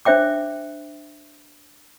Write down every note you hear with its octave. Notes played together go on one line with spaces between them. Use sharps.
D4 C5 E5 G5 D6